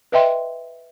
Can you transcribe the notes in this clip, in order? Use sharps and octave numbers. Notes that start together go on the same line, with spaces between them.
B4 D#5 E5 G5 C6